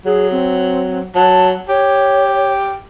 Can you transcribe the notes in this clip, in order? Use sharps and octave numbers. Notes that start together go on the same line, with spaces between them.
F#3 G#4
C4
F#3 A5
G4 C#5